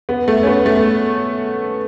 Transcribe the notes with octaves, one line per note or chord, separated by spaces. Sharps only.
B3
A3
C#4
B3
A3